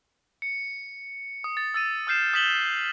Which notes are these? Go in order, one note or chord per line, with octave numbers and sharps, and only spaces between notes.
C#7
D#6
A6
E6 A6 D#7
D#6 F6 G6 C7 E7
D#6 G6 B6 E7 F#7 G7